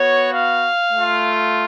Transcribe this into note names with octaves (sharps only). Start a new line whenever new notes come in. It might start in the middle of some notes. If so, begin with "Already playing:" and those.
Already playing: B3 F#4 C#5
F5
A3 F4